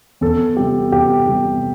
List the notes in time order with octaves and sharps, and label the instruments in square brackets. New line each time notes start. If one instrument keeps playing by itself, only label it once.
[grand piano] E2 A4
C3 G3 G4
E2 G4
C3 G3